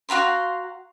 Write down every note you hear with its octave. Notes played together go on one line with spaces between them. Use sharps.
F#4 F5 A#5 C6